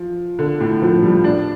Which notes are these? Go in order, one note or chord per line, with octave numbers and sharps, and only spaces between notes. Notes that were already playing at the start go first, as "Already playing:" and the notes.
Already playing: F3
D3
A2
F3
G3
D4